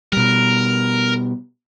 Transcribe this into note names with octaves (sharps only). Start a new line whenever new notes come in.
B2 G3 A#4